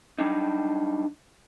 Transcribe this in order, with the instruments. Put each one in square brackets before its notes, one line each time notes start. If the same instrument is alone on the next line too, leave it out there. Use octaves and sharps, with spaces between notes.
[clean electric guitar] F#3 G3 D4 D#4